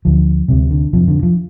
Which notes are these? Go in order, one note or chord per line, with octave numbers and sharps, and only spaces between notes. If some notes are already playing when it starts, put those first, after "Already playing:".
D2 D3 F3
D2 C3 G3
D3
F2 C3 F3
D3
F3